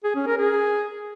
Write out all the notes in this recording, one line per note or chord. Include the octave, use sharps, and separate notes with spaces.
G#4
C#4
A#4
G#4